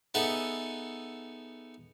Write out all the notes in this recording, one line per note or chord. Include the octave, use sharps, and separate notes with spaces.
B3 D#4 G#4 A4 E5 F#5